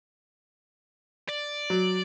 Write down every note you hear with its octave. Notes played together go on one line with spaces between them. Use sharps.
D5
F#3